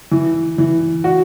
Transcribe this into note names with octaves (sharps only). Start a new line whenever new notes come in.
E3
E3
F#4